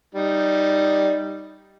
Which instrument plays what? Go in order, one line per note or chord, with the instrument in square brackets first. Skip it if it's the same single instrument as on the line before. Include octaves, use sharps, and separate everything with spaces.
[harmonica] G3 D#4